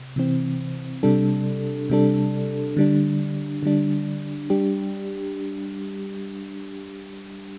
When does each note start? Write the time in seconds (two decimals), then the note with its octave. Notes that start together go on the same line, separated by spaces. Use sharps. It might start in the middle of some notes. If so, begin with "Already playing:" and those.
Already playing: C3
0.16 C3 E3 C4
1.03 C3 G3 D4 A4
1.90 C3 G3 D4 A4
2.77 D3 G3 D4
3.63 D3 G3 D4
4.50 G3 D4 G4